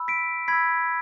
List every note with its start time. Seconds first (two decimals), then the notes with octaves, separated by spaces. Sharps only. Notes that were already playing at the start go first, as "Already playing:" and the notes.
Already playing: B5 E6
0.08 B6 D7
0.48 B5 E6 G#6 B6